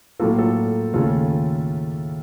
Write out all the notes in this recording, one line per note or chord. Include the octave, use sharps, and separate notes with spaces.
A2 F#3 A#3 F4 A4
F4 A4
D#2 C#3 A3 F4 A4